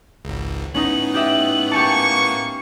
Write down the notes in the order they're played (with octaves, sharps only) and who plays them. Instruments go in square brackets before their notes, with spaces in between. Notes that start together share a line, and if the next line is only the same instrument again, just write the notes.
[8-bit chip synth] G#1 C#2
[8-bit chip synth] A2 B3 [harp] C#4 D#4 [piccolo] F#7
[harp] G4 D#5 E5
[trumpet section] A#3 C#6 [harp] G4 G#5 A5 [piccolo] C#7